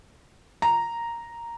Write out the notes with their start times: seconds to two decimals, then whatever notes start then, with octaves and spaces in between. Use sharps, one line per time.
0.62 A#5